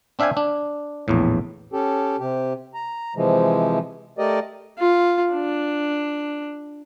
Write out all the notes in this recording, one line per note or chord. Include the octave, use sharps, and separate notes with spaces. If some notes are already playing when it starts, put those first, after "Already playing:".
C4 D4 E5 F5 G5 G#5
D4
A#1 E2 A2
C#4 G4 A4
C3 G4
A#5
C3 E3 F3 G#3
A3 G4 A#4 D5 D#5
F4
D4